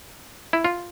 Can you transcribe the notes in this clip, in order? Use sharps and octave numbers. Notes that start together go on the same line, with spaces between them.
E4
F4